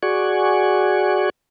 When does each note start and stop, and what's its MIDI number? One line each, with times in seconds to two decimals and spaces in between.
0.03 1.30 66
0.03 1.30 68
0.03 1.30 74
0.03 1.30 78
0.03 1.30 80
0.03 1.30 85